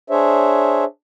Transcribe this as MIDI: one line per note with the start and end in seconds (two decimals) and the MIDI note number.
0.10 0.85 62
0.10 0.85 68
0.10 0.85 72
0.10 0.85 73
0.10 0.85 76